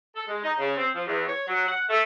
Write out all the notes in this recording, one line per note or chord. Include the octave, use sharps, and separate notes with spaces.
A4
G#3
D#4
C#3
C4
F3
E2
C#5
F#3
F#5
A3